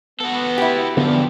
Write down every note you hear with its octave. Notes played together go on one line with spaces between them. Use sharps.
B3 F#4 A4
E4 G4
E2 D3 F3 G3 B3